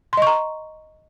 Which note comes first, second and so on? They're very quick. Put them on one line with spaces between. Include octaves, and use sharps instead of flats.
C6 D#5 C#6 A#5